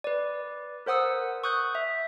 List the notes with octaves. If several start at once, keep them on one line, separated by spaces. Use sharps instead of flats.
B4 D5
A#4 C5 F#5 D#6 E6
C#6 D#6 F#6 G6
E5